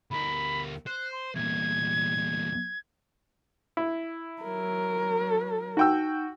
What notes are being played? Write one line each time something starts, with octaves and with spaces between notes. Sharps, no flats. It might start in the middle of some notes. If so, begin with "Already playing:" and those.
D2 A#4 B5
C5 F#6
C6
E2 A#2 G#6
E4
F#3 A#4
D#4 F#4 G5 E6